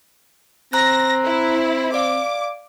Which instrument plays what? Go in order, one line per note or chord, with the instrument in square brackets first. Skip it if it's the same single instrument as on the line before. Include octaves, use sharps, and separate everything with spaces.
[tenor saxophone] C4 [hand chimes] A#5 F#6 [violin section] A#6
[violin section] E4
[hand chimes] D5 F5 [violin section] D6